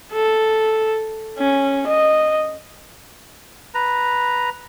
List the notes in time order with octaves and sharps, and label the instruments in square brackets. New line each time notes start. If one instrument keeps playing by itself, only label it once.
[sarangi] A4
C#4
D#5
[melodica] B4 A#5